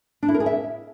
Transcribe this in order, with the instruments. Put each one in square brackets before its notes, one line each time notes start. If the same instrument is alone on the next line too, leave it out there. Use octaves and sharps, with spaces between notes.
[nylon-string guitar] D4
E4
A#4
G#4
E5